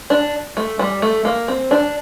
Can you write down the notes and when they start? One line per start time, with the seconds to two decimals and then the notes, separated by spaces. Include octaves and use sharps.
0.10 D4
0.57 A3
0.79 G3
1.02 A3
1.25 A#3
1.48 C4
1.71 D4